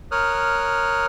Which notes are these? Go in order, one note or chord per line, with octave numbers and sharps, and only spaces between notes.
A#4 C#5 D#6 F6 F#6